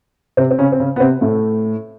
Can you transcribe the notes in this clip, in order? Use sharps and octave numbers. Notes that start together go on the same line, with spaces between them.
C3 C4
C4
C#3 C#4
C4
C#3 C#4
B3
C3 C4
A2 A3